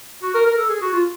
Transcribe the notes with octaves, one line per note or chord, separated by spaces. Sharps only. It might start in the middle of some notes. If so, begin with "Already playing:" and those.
F#4
A#4
A#4
A4
G#4
F#4
F4